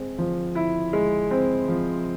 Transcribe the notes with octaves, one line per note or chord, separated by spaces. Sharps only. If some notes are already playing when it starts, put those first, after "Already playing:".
Already playing: G#3 C4
F3
E4
G#3
C4
F3